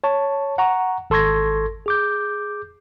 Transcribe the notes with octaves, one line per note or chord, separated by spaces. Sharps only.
C#5 A5 C#6
F#5 A#5 C#6
G#1 A4 C6 C#6 G#6 A#6
G#4 D6 G6